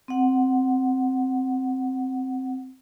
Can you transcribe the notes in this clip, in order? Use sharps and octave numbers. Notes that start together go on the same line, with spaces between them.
C4 F#5